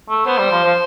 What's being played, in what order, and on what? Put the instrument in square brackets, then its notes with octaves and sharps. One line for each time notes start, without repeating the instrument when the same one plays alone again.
[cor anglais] A3
[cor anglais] B3 [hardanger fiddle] C5
[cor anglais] G3
F3
F3